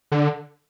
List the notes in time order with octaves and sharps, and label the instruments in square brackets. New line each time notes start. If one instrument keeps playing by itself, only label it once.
[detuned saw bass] D3